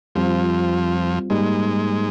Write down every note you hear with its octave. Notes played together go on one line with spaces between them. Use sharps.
F2 F3 G3 C4 F4
G#2 G3 G#3 A#3 D#4